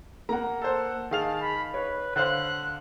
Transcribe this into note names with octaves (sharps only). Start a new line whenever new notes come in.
A#3 F#5 A#5
A4 C5 F#5
D#3 G#4 F5 A5 F7
B5
B4 C#5
D3 C5 F5 F#6